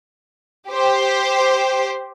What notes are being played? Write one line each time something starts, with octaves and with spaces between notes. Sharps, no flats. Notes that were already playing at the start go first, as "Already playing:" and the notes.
G4 C5